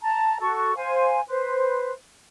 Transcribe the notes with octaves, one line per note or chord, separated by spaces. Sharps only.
A5 A#5
F#4 A4 C#6
C5 F5 G#5
B4 C5